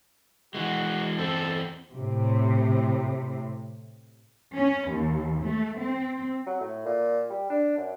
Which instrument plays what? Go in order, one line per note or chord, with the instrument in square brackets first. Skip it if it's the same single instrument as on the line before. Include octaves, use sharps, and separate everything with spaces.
[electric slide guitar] E3 G#3 [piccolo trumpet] F#4
[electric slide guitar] E2 C4 [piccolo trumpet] A4
[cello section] A2 C3
C#4
D#2
A3
C4
[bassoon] F#3
A2
A#2
G3
D4
F#2